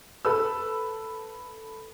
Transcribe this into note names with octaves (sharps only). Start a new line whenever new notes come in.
A4 B4 E6